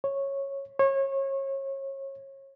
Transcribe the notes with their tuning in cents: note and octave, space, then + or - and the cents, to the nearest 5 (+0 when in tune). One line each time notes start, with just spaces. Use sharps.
C#5 -10
C#5 -30